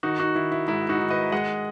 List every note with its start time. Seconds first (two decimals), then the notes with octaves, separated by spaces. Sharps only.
0.03 D#3 D#4 F#4
0.19 D#4 F#4
0.35 D#3 E4
0.52 E4
0.68 G#2 E4
0.89 D#4 F#4
1.00 D#3
1.10 B4 D#5
1.32 G#3 D#5 F#5